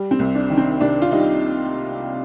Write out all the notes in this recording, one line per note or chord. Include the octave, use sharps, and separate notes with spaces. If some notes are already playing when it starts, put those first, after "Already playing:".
Already playing: G3
C4
C2
D4
D#3
C4
C3 D4
F4
G3 D#4